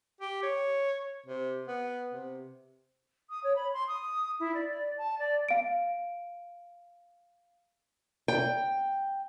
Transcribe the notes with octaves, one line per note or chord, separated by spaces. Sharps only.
G4
C#5
C3
B3
C3
D#6
C#5
B5
C6
D#6
E4
D5
D5
A5
D5
F5 D7
G5